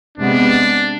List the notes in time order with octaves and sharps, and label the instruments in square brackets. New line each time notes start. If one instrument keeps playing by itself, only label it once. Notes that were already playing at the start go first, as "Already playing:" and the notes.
[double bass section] C3 G#3 B3 [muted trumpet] D4